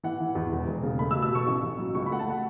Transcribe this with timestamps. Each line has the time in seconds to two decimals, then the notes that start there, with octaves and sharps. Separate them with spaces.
0.03 E3 F#5
0.20 E3
0.35 E2
0.52 E1
0.67 E1
0.83 C#3
0.99 A3 B5
1.11 E6
1.15 B2
1.22 E6
1.31 B2 C#6
1.47 A1
1.62 A1
1.78 F#3
1.95 C#2 C#6
2.06 B5
2.11 A3 F#5
2.19 A5
2.27 A3 F#5